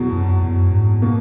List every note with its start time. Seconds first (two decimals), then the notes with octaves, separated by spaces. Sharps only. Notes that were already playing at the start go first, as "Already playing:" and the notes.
Already playing: E2 B2 F#3
0.12 F#2
0.42 F#2
0.71 G#2
1.02 B2 A#3